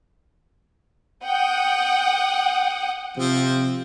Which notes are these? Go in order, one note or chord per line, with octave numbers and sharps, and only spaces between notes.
F#5 G5 D#6
C3 F3 C4